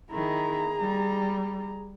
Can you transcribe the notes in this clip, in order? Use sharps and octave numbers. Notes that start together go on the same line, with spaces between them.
D#3 E4 G#4 A#5
G3